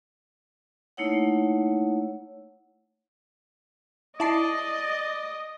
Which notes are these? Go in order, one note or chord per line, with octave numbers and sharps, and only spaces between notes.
A3 A#3 D#4 E4 C#5 F#5
E4 D5 D#5 A5 C7